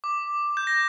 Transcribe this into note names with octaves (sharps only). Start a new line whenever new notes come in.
D6
G6
A#6